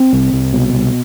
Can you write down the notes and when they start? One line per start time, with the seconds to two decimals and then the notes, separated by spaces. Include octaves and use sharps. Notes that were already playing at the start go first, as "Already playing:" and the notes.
Already playing: C4
0.13 C2
0.33 C2
0.53 B2
0.73 C2